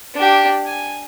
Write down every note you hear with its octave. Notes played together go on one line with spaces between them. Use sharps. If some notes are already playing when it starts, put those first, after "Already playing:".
D4 G4
G#5